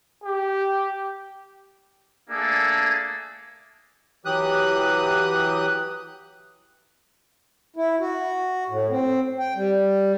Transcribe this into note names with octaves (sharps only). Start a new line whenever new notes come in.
G4
A3 A#3 D4 G#4 A4
E3 F#3 G4 D#6 F#6
E4
F#4
A2
C4
G5
G3